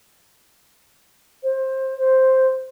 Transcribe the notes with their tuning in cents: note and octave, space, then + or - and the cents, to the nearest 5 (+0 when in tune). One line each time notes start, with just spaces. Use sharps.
C5 +20
C5 +0